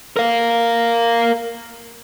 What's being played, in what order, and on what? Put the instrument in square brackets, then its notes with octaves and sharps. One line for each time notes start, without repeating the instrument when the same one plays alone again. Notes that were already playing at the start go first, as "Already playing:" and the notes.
[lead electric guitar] A#4 F5